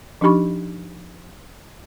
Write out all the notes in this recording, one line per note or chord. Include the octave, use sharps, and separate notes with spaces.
F3 D4 D#4 G4 B5 C#6